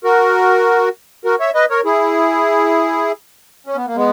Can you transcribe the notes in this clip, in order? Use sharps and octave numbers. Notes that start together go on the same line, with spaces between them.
F#4 A#4
F#4 A#4
C#5 E5
B4 D#5
A#4 C#5
E4 G#4
C#4
B3
A#3
G#3 B3